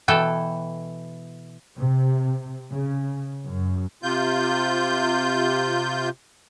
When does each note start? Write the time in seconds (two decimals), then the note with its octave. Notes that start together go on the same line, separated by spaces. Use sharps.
0.08 B2 E3 A4 G5
1.79 C3
2.72 C#3
3.45 F#2
4.03 C3 F4 G6